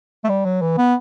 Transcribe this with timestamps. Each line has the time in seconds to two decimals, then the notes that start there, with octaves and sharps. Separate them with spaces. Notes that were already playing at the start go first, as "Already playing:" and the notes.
0.24 A3
0.29 G3
0.45 F#3
0.62 E3
0.78 B3